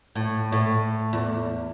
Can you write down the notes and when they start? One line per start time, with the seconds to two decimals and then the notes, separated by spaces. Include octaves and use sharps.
0.15 A2
0.52 A2
1.13 E2